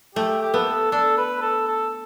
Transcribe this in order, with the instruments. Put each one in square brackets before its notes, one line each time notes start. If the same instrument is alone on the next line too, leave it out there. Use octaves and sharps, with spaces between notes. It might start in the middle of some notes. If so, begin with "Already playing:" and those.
[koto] A3 [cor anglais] G4
[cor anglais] G4
[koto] B3 [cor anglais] A4
[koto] D4 [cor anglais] A4
[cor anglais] B4
A4
A4